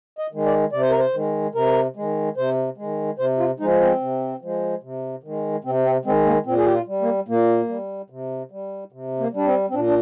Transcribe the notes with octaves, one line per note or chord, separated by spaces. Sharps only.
D#5
D#3 G#3
D5
C3 D5
C5
A#4
C5
D#3 G#3
C3 A#4
D#3 G#3
C3 C5
D#3 G#3
C3 C5
F4
F3 G#3 D#4
C4
C3
F3 G#3
C3
D#3 G#3
C3 C4
C4
D#3 G#3 C4
A#3
A#2 C4
G#4
G4
F4
G3
A#3
A#2 A#3
G3
C3
G3
C3
A#3
G3 D4
C4
C4
A#2 D4
D4